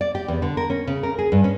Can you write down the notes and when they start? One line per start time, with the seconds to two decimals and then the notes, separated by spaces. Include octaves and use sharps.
0.01 D5
0.15 G4
0.28 E2
0.42 D3
0.57 A#4
0.70 C#4
0.87 C#3
1.03 A#4
1.19 G#4
1.32 G2
1.44 C#4